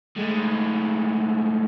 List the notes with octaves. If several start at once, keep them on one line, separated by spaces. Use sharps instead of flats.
A2 G#3